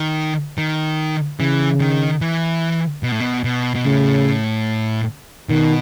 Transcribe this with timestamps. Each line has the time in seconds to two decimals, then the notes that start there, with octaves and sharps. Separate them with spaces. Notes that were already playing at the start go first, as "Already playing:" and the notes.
Already playing: D#3
0.58 D#3
1.39 C#3 E3
1.80 D#3
2.21 E3
3.03 B2
3.12 A2
3.20 B2
3.44 B2
3.75 B2
3.85 A2 C#3
5.49 B2 D#3